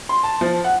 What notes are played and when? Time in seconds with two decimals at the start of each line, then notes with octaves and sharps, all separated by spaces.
0.09 C6
0.23 A5
0.41 F3
0.64 F#5